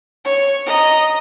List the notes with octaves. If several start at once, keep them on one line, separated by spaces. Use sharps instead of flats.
C#5
D#5 A#5